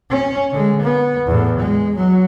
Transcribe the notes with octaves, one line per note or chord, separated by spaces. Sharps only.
C#4
D3 G#3
B3
E2 A2
G#3
F#3